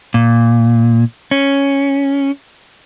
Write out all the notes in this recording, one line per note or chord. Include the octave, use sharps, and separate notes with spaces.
A#2
C#4